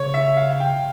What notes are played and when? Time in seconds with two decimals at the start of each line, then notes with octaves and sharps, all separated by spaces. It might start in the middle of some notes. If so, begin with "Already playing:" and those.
Already playing: C#3 C#5
0.14 E5
0.37 F5
0.60 G5